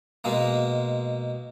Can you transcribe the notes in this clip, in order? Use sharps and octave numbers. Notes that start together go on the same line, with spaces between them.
B2 G#3 A#3